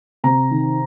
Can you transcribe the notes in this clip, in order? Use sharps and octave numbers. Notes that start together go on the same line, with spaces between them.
C3 A#5
D#3